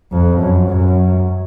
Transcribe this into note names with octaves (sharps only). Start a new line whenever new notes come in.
F2
F#2
F#2